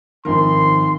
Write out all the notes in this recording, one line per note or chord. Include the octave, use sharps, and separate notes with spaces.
G#1 D#3 F3 A#4 C6